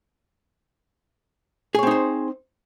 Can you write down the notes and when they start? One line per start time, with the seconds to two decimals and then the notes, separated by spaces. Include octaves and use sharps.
1.75 G#4
1.79 C#5
1.83 C4
1.87 D#4
1.91 C5